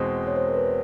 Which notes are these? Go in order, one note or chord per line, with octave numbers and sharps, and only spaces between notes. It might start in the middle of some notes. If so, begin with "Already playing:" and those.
Already playing: E2 B2 G#3 C4 C5
C#5
C5
A#4
B4